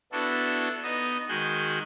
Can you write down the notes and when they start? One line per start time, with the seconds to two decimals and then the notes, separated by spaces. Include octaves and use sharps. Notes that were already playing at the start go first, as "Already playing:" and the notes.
0.12 B3 D4 E4 F#4 A4
0.83 B3 D#4 D#5
1.29 D#3 G#3 F#4 G#4 F#6 G6